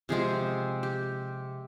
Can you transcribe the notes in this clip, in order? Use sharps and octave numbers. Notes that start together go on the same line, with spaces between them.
C3 F3 G#3 C4 G#4
G4